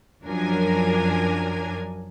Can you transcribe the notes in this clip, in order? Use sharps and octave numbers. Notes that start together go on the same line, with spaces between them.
F#2 F3 F#3 D4 A#4 G#5